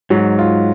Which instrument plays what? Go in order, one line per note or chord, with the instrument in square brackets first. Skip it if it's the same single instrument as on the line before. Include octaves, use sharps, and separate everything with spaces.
[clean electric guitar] G#2 [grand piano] F#3
[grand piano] F4